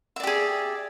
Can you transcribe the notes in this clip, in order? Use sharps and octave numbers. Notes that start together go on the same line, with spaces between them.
G4 G#4 D5 E5